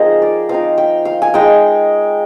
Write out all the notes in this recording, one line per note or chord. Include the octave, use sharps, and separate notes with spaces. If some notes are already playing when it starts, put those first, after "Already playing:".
Already playing: F3 C4 D#4 G#4 A#4 C5
D5
F3 C4 D#4 F5
G5
F5
G#5
G#3 D#4 G5